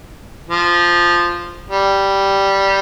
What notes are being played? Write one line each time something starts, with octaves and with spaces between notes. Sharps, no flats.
F3
G3